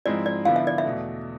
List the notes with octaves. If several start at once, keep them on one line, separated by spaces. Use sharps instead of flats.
G#2 F3 G#3 C4 E4 D5
D5
D3 F3 B3 E4 F5
E5
D5
E5
E2 B2 A3